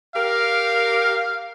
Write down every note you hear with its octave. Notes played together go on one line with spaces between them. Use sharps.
G4 A#4 F5